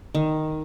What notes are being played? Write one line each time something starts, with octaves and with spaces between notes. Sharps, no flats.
D#3